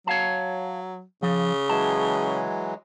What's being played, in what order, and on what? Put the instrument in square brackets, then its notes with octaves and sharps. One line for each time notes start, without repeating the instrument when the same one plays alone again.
[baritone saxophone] F#3 [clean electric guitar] C#5 F5 A5
[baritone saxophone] C#3 [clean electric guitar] F3
[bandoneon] E3 F#3 G#3 [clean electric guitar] A5